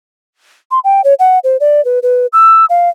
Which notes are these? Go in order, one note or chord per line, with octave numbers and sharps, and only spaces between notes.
C6
G5
C#5
F#5
C5
D5
B4
B4
E6
F5